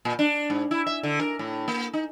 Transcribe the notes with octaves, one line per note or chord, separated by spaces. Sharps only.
A#2
D4
G#2
E4
E5
D3
A#4
A2
A#3
D#4